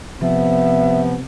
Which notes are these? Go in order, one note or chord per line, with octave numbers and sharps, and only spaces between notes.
C3 F3 B3 E5